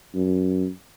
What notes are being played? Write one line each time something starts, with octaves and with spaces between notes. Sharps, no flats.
F#2